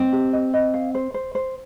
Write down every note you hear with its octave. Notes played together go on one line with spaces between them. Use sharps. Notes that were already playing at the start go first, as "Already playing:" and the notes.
Already playing: C4 D#5
G4
D#5
D#5
F5
C5
C5
C5